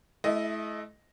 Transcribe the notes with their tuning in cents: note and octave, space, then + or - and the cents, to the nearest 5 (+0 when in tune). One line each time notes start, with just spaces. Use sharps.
A3 -35 E4 +0 D#5 +0